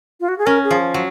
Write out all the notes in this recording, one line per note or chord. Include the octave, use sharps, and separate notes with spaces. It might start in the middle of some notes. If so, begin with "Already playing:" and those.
F4
F#4
G#4
C#4 A#4
G#4
F3
F#3